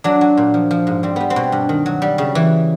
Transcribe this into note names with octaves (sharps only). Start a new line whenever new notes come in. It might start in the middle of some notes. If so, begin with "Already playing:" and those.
F#3 D4
F#3
A#2
F3
F3
G#2
G3 C4
G3 B3
C4
B2
G2
D#3
F#3
G3
C#3
E3